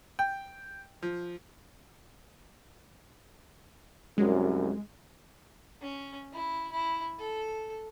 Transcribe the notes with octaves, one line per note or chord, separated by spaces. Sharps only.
G5
F3
C2 F#2 G#3
C#4
E4
E4
A4